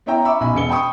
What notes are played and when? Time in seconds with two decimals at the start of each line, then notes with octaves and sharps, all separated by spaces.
0.06 B3 E4 C#5 E5 G5 A#5
0.25 E5 B5 C#6 D6 E6
0.40 B1 B2 G#5 B5
0.54 E1 B3 C#7 G7
0.69 G5 A5 B5 C#6 D#6 C#7